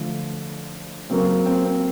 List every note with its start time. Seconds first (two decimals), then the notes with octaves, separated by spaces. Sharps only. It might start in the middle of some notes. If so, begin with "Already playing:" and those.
Already playing: D3 F3 A3
1.09 C#3 F#3 A#3 C4
1.46 C4
1.65 C4